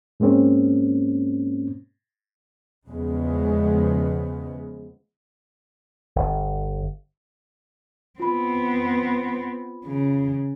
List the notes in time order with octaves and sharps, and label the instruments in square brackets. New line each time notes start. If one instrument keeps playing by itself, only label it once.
[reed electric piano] G#2 G#3 A#3 C4 C#4
[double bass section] E2 C#3 F3 G#3 B3
[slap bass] G1
[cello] B3 C4 [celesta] F4 B5
[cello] C#3